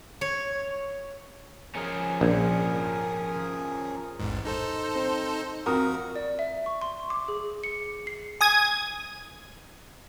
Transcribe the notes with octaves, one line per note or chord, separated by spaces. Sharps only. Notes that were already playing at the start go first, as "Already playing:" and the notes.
C#5
F3 C#4 G#4 A#4
A#1
A1 E2 G#2
D#4 A4 C5
C4
F2 F#4 A#4 D#6
D5
E5
C#6
C6
D6
G#4
C#7
C7
G#5 D#6 G#6